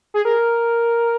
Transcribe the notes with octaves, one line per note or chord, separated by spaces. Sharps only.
G#4
A#4